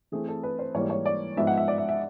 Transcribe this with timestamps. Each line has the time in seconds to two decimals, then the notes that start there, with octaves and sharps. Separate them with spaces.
0.12 E3 A3 C4 E4 G#4
0.28 A4
0.43 B4
0.59 C5
0.74 G#2 E3 G3 A#3 C#5
0.90 C#5
1.06 D5
1.37 G#2 F3 G#3 B3 D#4 E5
1.47 F#5
1.57 E5
1.68 D5
1.78 E5
1.89 E5